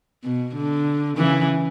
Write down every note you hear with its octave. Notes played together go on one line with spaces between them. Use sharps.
B2
D3
C#3 E3